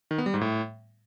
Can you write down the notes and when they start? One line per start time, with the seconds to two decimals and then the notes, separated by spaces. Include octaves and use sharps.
0.11 D#3
0.18 B3
0.26 G3
0.34 G#2
0.41 A2